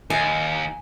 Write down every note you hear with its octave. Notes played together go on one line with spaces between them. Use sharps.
D#2 G#5